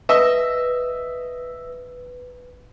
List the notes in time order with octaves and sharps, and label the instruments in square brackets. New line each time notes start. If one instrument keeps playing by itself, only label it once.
[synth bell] B4 [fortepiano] D#5 E5